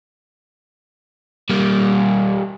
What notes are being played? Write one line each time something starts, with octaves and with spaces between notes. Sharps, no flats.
G3 A#3